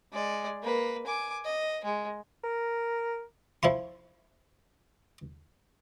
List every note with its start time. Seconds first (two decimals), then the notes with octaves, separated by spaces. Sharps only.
0.13 G#3 D5
0.63 A#3 B4
1.07 G#5 D6
1.45 D#5
1.84 G#3
2.44 A#4
3.63 F3 E4 F4 C6